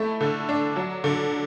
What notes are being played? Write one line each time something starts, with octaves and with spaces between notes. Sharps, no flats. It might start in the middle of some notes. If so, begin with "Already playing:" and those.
Already playing: A3 E4
D3
D4
F#3
D3